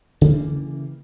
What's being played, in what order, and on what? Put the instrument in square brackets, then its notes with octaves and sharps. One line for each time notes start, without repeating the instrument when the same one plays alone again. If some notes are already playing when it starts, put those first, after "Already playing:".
[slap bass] C#3 E3 G3 A#3